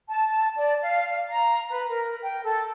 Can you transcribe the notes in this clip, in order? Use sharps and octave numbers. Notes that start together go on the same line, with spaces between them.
A5
D5
F5
A#5
B4
A#4
G5
A4